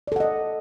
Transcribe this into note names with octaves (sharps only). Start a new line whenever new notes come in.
A4 D5 D#5 F#5